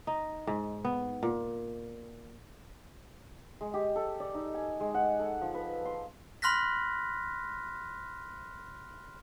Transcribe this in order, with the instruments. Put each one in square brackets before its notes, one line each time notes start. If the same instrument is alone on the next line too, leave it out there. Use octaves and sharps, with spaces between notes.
[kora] D#4
G#2
B3
A#2
[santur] G#3
G4
A4
D5
D#4
G#5
G#3
F#5
A4
F3
B4
C6
[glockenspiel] B5 C6 F6 F#6 A#6 B6